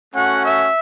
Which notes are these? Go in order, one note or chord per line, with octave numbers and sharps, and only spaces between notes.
A3 C#4 F#4 F#5
E5